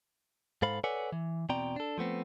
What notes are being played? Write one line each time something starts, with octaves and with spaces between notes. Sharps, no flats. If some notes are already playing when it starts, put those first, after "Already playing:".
G#2 A4 C5 F5 B5
A4 B4 C#5 D5 F#5 G#5
E3
E2 B2 C4 D5 G5 A#5
D4 A4
F3 A3 B3 C4